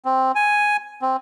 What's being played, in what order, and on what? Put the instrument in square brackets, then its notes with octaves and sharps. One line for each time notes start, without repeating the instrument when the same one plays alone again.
[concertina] C4
G#5
C4